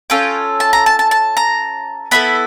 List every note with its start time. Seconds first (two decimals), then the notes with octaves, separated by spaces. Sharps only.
0.10 C#4 F4 A4 G5
0.60 A5
0.73 A#5
0.86 A5
0.99 A5
1.11 A5
1.37 A#5
2.11 B3 E4 A4 B5